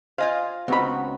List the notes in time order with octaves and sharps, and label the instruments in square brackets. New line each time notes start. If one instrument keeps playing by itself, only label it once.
[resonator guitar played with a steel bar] F4 D#5 F5 [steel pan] C5 G#5
[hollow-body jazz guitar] C#2 B5 [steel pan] B3 C4 D#4 [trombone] F#4